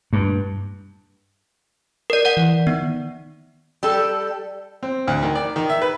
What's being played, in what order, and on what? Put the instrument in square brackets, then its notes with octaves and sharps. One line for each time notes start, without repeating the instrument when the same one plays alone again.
[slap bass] G2
[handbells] A#4 D5
D5 F#5
[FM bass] E3
[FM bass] D#3 [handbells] B3
[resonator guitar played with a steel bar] G3 A4
[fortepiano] C4
D2
D#3
D5
D#3
E5
B4